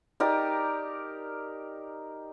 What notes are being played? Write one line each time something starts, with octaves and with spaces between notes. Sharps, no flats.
D#4 G4 A#4 D5